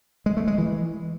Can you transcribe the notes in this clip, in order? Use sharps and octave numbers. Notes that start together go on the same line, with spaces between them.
G#3
A3
G#3
E3